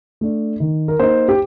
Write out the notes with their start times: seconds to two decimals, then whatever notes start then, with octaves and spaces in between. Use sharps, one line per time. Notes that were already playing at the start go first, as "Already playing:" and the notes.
0.21 A3 D4
0.60 D#3
0.88 A#4
0.99 A#3 D#4 C5
1.29 G4